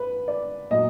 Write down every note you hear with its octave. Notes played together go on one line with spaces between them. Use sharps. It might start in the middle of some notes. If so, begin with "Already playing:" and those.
Already playing: B4
D5
A#2 F#3 D#5